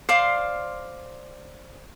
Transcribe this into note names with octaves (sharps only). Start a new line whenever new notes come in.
C5 D5 F5 C6